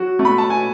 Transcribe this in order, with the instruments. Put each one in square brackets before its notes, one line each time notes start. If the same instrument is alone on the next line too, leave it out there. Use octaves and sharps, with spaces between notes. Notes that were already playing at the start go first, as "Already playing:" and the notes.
Already playing: [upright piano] F#3 F#4
A3
B5
A5
G#5